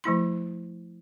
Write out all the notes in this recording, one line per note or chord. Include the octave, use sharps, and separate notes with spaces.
F3 A3 E4 C6